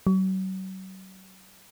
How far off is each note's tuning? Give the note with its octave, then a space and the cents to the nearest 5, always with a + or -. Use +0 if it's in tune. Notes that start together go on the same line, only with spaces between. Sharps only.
F#3 +35